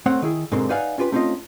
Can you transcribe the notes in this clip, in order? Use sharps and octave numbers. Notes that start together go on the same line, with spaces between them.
A3 C4 C#5 F#5
D#3 E4 G#4
G#2 B2 D3 C4 A#4 C6
D#4 B4 D5 F5 F#5 G#5
C#4 F4 G4 B4
A3 C4 C#4 D#4 F4 D#5